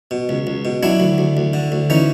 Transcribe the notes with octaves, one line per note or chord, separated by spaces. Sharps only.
B2
C#2
C#2
B2
F#3 D4 E4
D2
D2
D2
D3
D2
E3 C#4 D#4